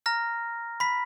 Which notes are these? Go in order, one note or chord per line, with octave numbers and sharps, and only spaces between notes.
A#5 F6 A#6
B5 B6